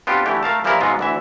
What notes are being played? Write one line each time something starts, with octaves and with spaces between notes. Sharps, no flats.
B3 C4 D4 F4 G4
D3 E3 A3 E4 G4
A3 A#4 F5 A5
E3 F3 G3 A#3 E4 A#4
G#2 B2 F#3 G#3 B3 F4
D2 E3 E5